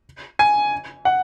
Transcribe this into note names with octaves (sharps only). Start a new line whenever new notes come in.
G#5
F#5